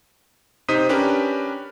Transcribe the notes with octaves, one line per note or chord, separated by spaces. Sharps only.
C3 D#4 C5 D#6 B6 D#7
C#4 D4 G4 A#4 B4